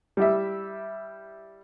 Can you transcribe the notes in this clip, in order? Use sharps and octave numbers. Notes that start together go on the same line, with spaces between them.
G3 E4 G4 E5